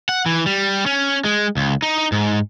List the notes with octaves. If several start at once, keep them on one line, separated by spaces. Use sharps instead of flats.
F#5
E3
G3
C#4
G#3
C#2
D#4
G#2